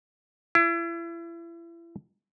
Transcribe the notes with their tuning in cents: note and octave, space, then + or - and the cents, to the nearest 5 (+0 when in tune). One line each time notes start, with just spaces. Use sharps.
E4 +35